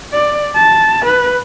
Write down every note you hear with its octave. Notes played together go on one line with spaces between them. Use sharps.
D5
A5
B4